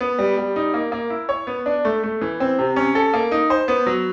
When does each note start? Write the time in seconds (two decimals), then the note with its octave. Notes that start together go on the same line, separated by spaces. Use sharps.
0.01 B3
0.18 G3
0.37 G3
0.56 D#4
0.74 A#3
0.92 A#3
1.10 E4
1.29 C#5
1.47 B3
1.66 D4
1.85 A3
2.04 A3
2.22 E3
2.40 C4
2.59 C3
2.76 C#4
2.95 A4
3.14 A#3
3.32 D#4
3.50 C5
3.68 B3
3.87 F#3